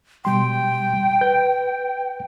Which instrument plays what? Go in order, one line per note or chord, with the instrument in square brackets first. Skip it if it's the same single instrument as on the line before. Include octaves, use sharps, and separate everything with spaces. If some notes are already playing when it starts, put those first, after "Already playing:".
[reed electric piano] B2 G3 C6 [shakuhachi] G5
[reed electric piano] B4 G6